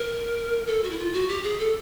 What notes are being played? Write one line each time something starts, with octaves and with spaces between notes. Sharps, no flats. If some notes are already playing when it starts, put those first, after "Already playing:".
Already playing: A#4
A4
F#4
E4
F4
F#4
G4
G#4
A4